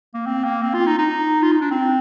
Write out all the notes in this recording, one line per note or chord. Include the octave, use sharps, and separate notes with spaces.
A#3
C4
A#3
C4
F4
D#4
D#4
F4
D#4
D4
C4